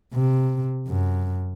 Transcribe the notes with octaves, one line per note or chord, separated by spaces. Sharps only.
C3
F#2